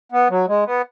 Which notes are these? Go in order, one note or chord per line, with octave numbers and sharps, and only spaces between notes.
B3
F#3
G#3
B3